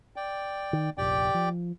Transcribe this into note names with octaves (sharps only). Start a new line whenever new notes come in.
D5 G5
D#3
F1 A#1 G4 D5 G5
F3